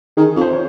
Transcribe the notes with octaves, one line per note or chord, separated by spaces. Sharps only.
D#3 G#4
F2
C5
C#5